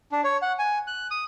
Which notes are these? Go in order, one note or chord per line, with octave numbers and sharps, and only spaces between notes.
D4
C#5
F#5
G#5
F#6
D#6